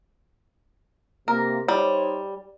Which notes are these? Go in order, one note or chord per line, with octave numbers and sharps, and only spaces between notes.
C3 A#3 A#4
G3 D#4 C5 C#5